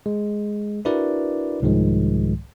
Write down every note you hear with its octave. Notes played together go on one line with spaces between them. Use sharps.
G#3
D4 E4 F#4 A#4 B4 D5
C2 G#2 D#3 F3 G#3